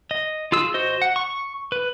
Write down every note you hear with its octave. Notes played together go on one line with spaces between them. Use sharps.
D#5
F4 G#4 E6
F#4 C5 D#5
F#5
C#6
B4